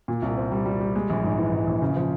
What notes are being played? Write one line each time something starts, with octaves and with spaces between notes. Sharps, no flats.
A#2
C2
C4
G3
G3
G3
G#3
A#1
G#2
E3
G#2
A#1
C#3
F3